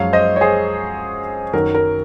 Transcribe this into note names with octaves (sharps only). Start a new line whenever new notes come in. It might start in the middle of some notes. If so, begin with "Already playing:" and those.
Already playing: F#2 F3 G#3 C#5 F5
C5 D#5
C#5
G#4 C5
F#2 D#3 F#3 A#4
A#4